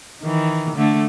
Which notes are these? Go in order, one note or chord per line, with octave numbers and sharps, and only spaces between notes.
D#3 E3
D3 A3